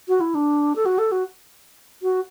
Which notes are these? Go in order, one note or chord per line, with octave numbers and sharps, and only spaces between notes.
F#4
E4
D4
A4
F#4
A4
F#4
F#4